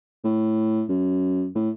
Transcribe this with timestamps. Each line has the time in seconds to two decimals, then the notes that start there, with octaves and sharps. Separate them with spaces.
0.24 A2
0.89 F#2
1.55 A2